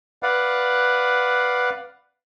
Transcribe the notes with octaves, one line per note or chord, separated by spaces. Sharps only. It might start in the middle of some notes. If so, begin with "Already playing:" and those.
B4 D5 F5 F#5